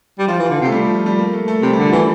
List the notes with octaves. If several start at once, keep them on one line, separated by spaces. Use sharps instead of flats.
G3
F3 F4
E3
D3
C3
A3
G3
F3
F3
G3
A#3
A3
A3
C3 G3
G3
D3
F3
E3 G3